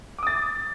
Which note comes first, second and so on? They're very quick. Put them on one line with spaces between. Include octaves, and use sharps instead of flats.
D6 D#6 A6